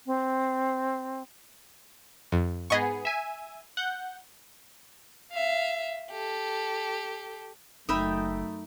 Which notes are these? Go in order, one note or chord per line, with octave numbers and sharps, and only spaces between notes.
C4
F2
G#2 B3 G#4 D#5 C#6
E5 G#5
F#5 G6
E5 F5
G4 A4
F#1 F#2 A3 D#4 E5 G5 B5 D#6